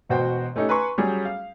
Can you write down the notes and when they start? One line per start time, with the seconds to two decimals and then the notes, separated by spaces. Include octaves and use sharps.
0.09 E1 B2 F#4 C5 G5
0.56 A3 C#4 D#4 G4
0.69 B4 G#5 A#5 C6 C#6
0.98 F#3 G3 C#4 G#4
1.25 F5